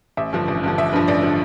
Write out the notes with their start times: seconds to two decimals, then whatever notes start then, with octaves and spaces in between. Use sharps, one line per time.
0.17 A1 E5
0.33 G2 D3 F3
0.48 A1
0.63 G2 D3 F3
0.78 A1 E5
0.93 G2 D3 F3 B4
1.08 A1 D5
1.23 D3 F3